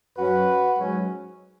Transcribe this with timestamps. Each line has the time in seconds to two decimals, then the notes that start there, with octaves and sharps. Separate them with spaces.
0.17 F#2 F#3 C#4 F#4 B4
0.78 G#2 F#3 C#4